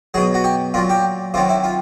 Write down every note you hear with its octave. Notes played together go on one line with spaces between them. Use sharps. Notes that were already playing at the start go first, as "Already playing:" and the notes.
B2 F#3 G#4
F#4
G4
A#2 F#3 F4
G4
C3 D#3 F#3 F4
E4
F4